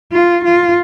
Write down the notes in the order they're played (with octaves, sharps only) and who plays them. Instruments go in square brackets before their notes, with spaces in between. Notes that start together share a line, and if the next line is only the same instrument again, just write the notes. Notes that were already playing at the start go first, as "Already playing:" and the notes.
[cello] F4
F4